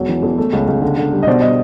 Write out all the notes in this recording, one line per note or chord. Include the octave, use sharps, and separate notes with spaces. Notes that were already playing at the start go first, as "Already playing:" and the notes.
Already playing: E1 F#3
E3
E1
A3
C#2
C#2
D3
D3
G3
D#5
B2 C5 D5
B2 D#5